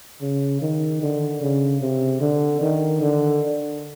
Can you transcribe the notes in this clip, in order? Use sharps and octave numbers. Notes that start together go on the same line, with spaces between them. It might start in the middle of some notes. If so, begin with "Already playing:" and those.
C#3
D#3
D3
C#3
C3
D3
D#3
D3